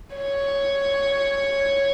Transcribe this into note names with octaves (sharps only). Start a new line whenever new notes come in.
C#5